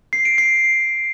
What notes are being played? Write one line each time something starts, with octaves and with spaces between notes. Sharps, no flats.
C7
D7
C7